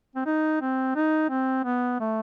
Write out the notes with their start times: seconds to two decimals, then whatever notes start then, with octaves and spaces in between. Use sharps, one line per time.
0.16 C4
0.26 D#4
0.61 C4
0.95 D#4
1.30 C4
1.64 B3
2.00 A3